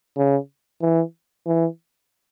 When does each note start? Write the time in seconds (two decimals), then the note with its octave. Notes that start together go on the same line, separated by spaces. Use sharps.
0.17 C#3
0.82 E3
1.46 E3